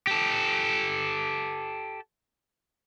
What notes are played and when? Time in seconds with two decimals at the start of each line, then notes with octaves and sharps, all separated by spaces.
0.07 G4 A4